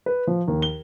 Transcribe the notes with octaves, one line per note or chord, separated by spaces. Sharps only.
B4
F3
D#2
G7